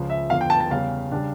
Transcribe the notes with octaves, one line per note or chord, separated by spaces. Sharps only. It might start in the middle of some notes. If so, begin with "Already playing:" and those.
Already playing: C#2 C#3 F3
E5
E2 D3 F3 F5
G5
A5
A5
E2 C#3 G3 F5
C#3 G3 D4